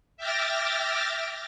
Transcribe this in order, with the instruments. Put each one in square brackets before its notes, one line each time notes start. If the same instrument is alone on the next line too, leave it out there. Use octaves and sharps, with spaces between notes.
[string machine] E5 G5 D6 F6 A6 A#6